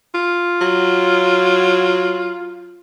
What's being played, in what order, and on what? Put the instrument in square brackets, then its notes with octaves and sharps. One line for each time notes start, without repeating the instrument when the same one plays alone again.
[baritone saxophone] F4
[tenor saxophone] F#3